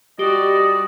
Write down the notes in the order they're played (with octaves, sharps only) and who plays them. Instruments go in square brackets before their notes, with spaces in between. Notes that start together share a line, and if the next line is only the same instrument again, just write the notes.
[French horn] G3 [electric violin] F#4 D5 [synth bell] G4 [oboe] D#5